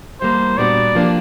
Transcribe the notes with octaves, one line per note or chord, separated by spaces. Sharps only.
E3 G3 A#3 C5
A#2 G3 B3 D4 F#4 D5
F3 A#3 D4 G4